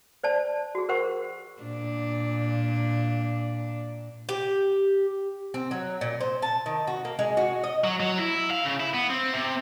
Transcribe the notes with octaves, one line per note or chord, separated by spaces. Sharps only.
C5 D5 A5
F#4 G#4
A#4 C5 F#5 C#6
A#2 D4
G4
C4
F#3
A#2
C5
A5
D#3
F#4
A#3
G#3
F#4
D#5
F#3
F#3
E4
F5
C#3
E4
B3
C4
C3